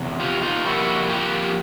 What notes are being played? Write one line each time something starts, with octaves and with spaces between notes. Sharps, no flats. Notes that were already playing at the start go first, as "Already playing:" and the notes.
Already playing: E2 C3
F4 G4
D#4 F4
F2 D3 G3 A#3 E4 F#4
F4 G4